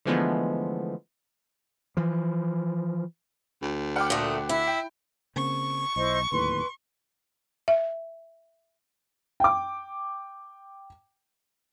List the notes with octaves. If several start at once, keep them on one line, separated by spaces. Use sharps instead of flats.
D3 E3 F3 G#3 A3 B3
E3 F3
D2
F#5 G5 D6 F6
A#2 A3 D#6
E4 E5
G5
C#3 A#3 C4 C#6
B1 E4 C5 D#5
D1 D#2 A2 B4 C6
E5
G5 D6